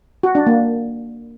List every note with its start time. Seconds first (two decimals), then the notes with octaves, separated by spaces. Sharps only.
0.23 F#4
0.35 D4
0.47 A#3